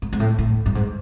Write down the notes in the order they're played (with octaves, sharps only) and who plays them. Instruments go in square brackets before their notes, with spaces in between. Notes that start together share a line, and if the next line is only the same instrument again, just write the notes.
[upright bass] G#2
G#2
A2
A2
G2
G#2